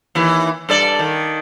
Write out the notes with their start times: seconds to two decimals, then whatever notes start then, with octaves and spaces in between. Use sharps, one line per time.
0.15 D#2 E3
0.69 G2 A4 D5
0.99 D#3